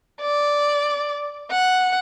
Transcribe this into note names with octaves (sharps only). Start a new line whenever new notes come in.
D5
F#5